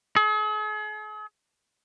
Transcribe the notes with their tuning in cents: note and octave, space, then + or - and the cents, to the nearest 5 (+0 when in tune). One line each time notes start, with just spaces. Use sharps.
G#4 +45